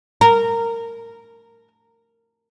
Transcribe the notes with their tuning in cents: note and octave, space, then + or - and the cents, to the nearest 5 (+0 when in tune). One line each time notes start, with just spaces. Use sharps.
A#4 -15